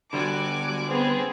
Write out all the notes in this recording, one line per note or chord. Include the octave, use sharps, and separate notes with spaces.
D3 G3 F#4 G#5 D6
B3 C4 G#4